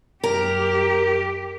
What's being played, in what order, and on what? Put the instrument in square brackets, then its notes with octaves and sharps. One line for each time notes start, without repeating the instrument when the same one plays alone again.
[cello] F#2 G4 [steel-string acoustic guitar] A#4